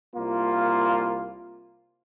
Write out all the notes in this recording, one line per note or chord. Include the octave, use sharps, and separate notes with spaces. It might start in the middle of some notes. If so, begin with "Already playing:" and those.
C2 A#3 F4